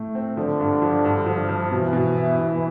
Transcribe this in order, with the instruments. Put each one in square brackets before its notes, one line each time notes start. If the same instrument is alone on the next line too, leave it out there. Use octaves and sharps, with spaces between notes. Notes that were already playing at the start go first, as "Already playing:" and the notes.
Already playing: [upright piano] A2 A3
C4
[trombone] D3 [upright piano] F3
[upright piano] G2
F3
G2
F3
F3
[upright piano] B2 [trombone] E3
[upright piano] B2
E4
B2